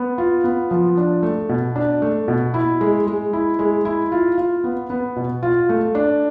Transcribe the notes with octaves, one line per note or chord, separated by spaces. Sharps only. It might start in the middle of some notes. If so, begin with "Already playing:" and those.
Already playing: B3
F4
B3
F3
D4
A3
B2
D4
A3
B2
E4
G#3
G#3
E4
G#3
E4
F4
F4
B3
B3
B2
F4
A3
D4